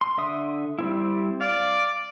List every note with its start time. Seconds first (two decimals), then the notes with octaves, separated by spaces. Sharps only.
0.01 C6
0.18 D3 E5 D#6
0.79 G3 C4 E4
1.41 D5 F5